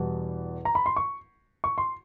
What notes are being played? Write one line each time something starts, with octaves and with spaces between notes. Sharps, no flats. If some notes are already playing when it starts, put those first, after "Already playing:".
Already playing: E2 B2 G3
A#5
B5
C6
C#6
C#6
C6